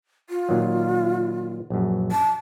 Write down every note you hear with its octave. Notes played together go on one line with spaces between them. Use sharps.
F4
A#2 D#3 F#3
A#1 F#2
A5